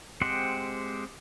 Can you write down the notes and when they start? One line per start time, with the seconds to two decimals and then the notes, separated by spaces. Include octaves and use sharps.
0.21 G#3 C4 G4 C5 F#5